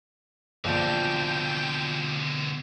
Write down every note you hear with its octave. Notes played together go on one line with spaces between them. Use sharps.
A#1 B2 D3 F3 D5 G5